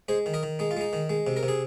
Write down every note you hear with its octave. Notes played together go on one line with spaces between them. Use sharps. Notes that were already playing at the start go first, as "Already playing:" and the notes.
G#3 G#4 C5
D#3
A#4 D#5
D#3
G#3 D#4
F4
G#3 D#4
D#3
G#3
C3
A#4
C3
G#4